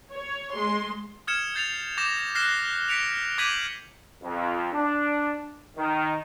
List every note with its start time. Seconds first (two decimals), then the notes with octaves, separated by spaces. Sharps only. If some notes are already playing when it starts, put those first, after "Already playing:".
0.14 C#5
0.53 G#3 C6
1.27 D#6 F6 G#6 C#7 E7
1.54 F6 G6 A6 C7 F7
1.98 D6 G6 A#6 E7
2.35 F6 F#6 A#6 C7 E7 G7
2.88 B6 C#7 D7 F7
3.38 D6 G6 G#6 B6 D#7 F#7
4.22 F2
4.73 D4
5.77 D#3